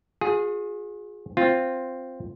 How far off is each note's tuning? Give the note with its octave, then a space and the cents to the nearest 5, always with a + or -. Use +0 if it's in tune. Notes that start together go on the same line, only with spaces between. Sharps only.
F4 +45 G#4 +0
C4 +0 F4 +0